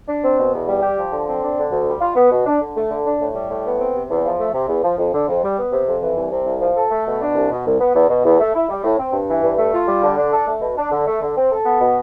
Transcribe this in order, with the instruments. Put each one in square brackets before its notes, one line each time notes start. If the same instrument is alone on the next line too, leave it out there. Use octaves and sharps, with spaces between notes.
[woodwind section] D4
C4
B2
E2
G3
G4
F3
D3
C4
D4
D3
D2
G3
F4
B3
B2
D4
D3
A3
D3
D4
A2
G3
A2
B3
C4
C3
E2
F3
A3
C3
E2
F3
F2
D3
F2
G3
B3
C3
F2
E3
C2
C3
C2
F3
A4
A3
B2
D4
C2
B2
C2
B3
E2
B2
E2
A3
E4
G3
A2
C4
G2
E3
G2
A3
F4
G3
D3
D4
A4
A3
B2
D4
D3
A3
D3
C4
A4
B3
B2